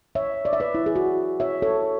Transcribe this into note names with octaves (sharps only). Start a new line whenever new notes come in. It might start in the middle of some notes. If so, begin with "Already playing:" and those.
C#5 E5
D5
E5
B4 D5
E4
G#4
F#4
C#5 E5
A4 C#5